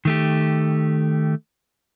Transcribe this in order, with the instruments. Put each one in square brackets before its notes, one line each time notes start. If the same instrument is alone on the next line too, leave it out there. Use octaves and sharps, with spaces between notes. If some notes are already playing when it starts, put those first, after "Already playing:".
[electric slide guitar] D#3 A3 G4